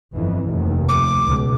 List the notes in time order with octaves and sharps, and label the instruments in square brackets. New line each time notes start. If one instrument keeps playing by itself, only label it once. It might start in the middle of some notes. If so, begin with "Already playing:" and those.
[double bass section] G1 F2 E3
F1 D#2
[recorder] D6
[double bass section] C#2 B2